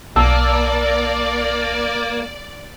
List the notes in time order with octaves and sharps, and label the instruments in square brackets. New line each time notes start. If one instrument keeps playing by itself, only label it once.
[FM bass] B1 [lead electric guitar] A#3 [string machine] D5 [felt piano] A5 E6